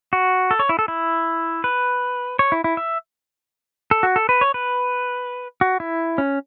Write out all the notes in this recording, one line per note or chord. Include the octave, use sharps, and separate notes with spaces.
F#4
A4
C#5
E4
A4
E4
B4
C#5
E4
E4
E5
A4
F#4
A4
B4
C#5
B4
F#4
E4
C#4